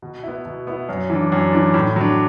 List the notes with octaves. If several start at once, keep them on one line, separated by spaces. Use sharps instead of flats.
B2
B3 E4
B2
B3 E4
F#2
E3 D4
F#2
E3 D4
A2
F#3 D4